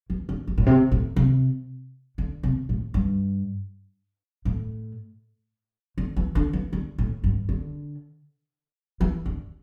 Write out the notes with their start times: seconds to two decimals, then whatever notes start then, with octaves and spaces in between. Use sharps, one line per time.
0.10 E3
0.29 D3
0.47 E3
0.58 A2
0.66 C3
0.91 A2
1.16 C3
2.18 D3
2.43 C3
2.69 A2
2.94 G2
4.45 A2
5.98 D3
6.16 E3
6.35 D3
6.53 E3
6.73 D3
6.98 A2
7.24 G2
7.49 D3
9.01 E3
9.26 D3